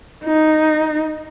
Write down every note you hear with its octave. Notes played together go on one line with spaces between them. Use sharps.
D#4